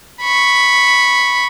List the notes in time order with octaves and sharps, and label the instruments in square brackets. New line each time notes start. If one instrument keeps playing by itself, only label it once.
[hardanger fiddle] B5 C#6